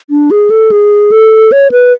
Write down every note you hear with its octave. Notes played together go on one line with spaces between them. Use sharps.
D4
G#4
A4
G#4
A4
C#5
B4